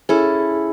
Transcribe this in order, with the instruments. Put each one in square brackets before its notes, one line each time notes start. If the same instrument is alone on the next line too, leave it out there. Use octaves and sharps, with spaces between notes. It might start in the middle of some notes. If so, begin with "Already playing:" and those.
[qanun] C#4 E4 A4 [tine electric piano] G#4